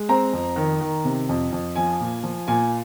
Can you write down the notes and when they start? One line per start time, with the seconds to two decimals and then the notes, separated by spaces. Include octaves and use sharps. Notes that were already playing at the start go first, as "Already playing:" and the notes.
Already playing: G#3
0.09 C4 A#5
0.33 F2
0.56 D#3
0.81 D#3
1.05 C3
1.29 F2
1.52 F2
1.76 F3 G#5
2.00 A#2
2.23 F3
2.48 A#2 G#5